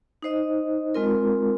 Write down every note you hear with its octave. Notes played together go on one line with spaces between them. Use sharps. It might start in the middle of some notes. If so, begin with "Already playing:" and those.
D#4 C5 D#5
G#3 C4 F4 A#4